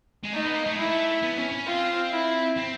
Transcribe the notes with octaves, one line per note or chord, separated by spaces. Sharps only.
G#3
A3 D#4
B3
A#3
A3
G#3 E4
A3
B3
C#4
C#4
C4 F4
E4
C4